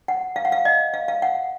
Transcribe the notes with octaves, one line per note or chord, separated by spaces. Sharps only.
F#5
F5
F#5
F5
D#5
F5
F5
F#5